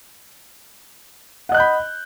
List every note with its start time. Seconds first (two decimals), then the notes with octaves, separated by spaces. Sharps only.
1.49 F#5
1.52 D#5
1.54 F#6
1.57 G6
1.60 B5